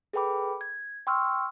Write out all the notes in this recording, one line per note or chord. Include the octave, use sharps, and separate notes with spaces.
G#4 A4 B4 G5 B5 D6
G#6
G5 C6 C#6 E6 F6